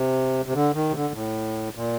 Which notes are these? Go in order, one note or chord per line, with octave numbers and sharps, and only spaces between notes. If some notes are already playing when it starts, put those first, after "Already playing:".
Already playing: C3
C3
D3
D#3
C3
D3
A2
A#2